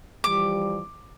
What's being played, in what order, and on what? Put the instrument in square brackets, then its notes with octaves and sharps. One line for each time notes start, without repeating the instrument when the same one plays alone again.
[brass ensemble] E3 F3 G3 [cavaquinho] D6